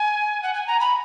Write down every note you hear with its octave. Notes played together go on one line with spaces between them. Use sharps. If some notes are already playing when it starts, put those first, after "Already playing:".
Already playing: G#5
F#5
G#5
A#5
B5